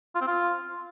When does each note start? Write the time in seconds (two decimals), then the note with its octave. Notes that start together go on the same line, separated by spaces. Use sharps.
0.15 F4
0.21 C4
0.28 F4